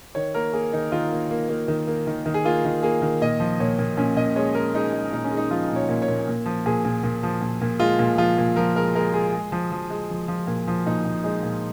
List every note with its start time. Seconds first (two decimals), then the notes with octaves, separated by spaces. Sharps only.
0.15 D#3 C#5
0.34 A#3 A#4
0.53 A#3 G#4
0.73 D#3 D#4
0.92 D#3 F4
1.11 A#3
1.31 A#3
1.49 A#3
1.68 D#3
1.87 A#3
2.07 D#3
2.26 D#3
2.34 G#4
2.45 A#3 F4
2.65 D#3
2.83 A#3 G#4
3.02 D#3
3.22 A#2 D#5
3.40 F3
3.60 A#2 C#5
3.79 A#2
3.97 A#2 C#4
4.17 A#2 D#5
4.36 G#3 C#5
4.55 G#3 A#4
4.74 G#3 D#4
4.93 G#3
5.12 A#2 D#4
5.24 C#4
5.31 G#3
5.37 D#4
5.51 F3 F4
5.70 A#2
5.76 C#5
5.89 A#2
6.02 C#5
6.08 A#2
6.28 A#2
6.46 F3
6.66 A#2 G#4
6.85 A#2
7.03 A#2
7.23 F3
7.41 A#2
7.62 A#2
7.80 G#3 F4
7.99 A#2
8.18 F3 F4
8.38 A#2
8.56 F3 A#4
8.75 G#3 A#4
8.95 G#3 A#4
9.13 G#3 G#4
9.32 G#3
9.52 F3
9.72 F3
9.90 G#3
10.10 F3
10.28 F3
10.47 A#2
10.67 F3
10.86 A#2 D#4
11.05 A#2
11.24 G#3 D#4
11.43 A#2